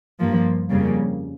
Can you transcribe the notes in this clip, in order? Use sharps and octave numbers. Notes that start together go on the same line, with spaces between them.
G2 F3 A#3
F2 C#3 G3 A#3